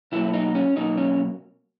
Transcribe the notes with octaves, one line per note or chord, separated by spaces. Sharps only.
B2 F#3 A#3 E4
D#4
C#4
B2 F#3 A#3 D#4
C#4